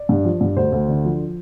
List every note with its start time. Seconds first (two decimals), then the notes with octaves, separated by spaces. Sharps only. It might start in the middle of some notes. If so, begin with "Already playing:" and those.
Already playing: D5
0.09 G2
0.24 F3
0.41 G2
0.56 D2 C5
0.72 D2
0.88 D3
1.04 F3